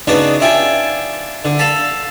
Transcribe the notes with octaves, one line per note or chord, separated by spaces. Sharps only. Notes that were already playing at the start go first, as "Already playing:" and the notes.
C#3 B3 D4 D#4 F#4 B4
D4 E4 F4 G5 G#5
D3
A4 F5 A5 B5